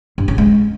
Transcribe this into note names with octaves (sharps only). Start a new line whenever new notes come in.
G2
C#3
G#3